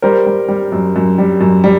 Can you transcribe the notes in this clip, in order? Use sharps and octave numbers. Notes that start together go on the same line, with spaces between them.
G3 A#4 C5
G3
G3
F#2
F#2
G3
F#2
G3